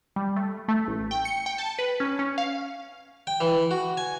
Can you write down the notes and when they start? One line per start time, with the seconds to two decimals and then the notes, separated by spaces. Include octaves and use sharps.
0.16 G3
0.36 A3
0.68 A3
0.87 A1
1.11 G5
1.25 C#7
1.46 G5
1.58 A5
1.79 B4
2.00 C#4
2.19 C#4
2.38 F5
3.27 G5
3.41 E3
3.71 F#4
3.97 G#5